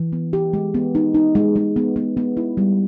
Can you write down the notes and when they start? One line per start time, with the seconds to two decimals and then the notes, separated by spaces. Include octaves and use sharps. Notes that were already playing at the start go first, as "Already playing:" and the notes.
Already playing: E3
0.13 B3
0.33 G4
0.53 G#3
0.74 B3
0.95 D#4
1.15 D#4
1.35 G#3
1.56 G#3
1.76 B3
1.96 B3
2.17 B3
2.37 E4
2.57 G3